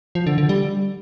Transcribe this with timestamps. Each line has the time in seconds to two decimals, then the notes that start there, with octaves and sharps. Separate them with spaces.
0.15 F3
0.27 D3
0.38 D3
0.49 G3